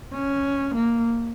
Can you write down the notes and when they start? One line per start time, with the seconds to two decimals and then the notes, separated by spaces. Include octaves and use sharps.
0.14 C#4
0.75 A#3